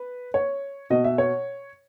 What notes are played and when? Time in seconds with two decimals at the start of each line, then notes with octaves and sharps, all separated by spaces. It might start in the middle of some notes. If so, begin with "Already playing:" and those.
Already playing: B4
0.34 C#5
0.90 B2 D#5
1.04 E5
1.18 C#5